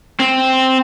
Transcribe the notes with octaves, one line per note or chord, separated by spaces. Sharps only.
C4